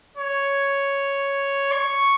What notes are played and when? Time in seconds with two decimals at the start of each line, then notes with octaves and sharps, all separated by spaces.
0.17 C#5
1.72 C#6